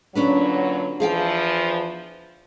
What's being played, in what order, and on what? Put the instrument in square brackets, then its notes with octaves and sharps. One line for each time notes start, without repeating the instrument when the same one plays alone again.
[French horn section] A#2 D3 F#3 [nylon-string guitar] C#4 D4 B4
[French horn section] E2 E3 F3 [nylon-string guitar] G#4 F5 G5